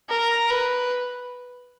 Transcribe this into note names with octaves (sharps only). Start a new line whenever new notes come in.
A#4
B4